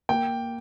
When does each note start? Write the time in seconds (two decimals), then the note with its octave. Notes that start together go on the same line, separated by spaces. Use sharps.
0.09 A#3 G5